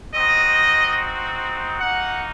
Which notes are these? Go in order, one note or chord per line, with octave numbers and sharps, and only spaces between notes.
C4 D#4 F#4 D#5
A#3 D#4 F#4 F#5